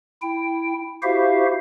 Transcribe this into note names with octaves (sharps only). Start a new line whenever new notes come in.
E4 G5
E4 F#4 G4 C5 E5 F5